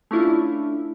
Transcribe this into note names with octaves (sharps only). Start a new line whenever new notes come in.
A3 C#4 D4 E4 F4